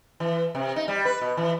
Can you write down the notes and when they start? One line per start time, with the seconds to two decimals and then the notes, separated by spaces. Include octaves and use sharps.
0.20 E3
0.55 C3
0.76 D#4
0.88 G3
1.05 B4
1.21 B2
1.37 E3